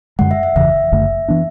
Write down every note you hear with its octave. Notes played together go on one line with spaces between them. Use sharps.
F#2 D3 G#3 F#5
E5
E5
F#1 E2 C#3 E3 E5
F#1 F#2 D3 A3
E3 B3 D4